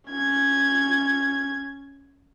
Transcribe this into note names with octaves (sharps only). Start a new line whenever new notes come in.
C#4 G#6